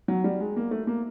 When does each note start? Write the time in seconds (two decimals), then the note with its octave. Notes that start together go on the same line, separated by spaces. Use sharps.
0.08 F#3
0.24 G3
0.40 G#3
0.56 A#3
0.71 A3
0.87 A#3